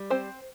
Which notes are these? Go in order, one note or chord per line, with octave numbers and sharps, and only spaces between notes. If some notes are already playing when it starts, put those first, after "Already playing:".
Already playing: G3
C4 C5